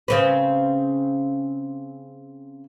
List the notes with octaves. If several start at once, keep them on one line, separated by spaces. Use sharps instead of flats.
C#3 C4 B4